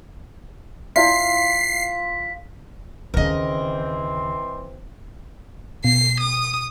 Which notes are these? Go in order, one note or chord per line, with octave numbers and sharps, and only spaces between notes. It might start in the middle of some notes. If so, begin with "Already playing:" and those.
E4 F4 D5 E5 B6 C7
D#2 C#3 E3 C4 A#4 D#5
B2 C7
D#6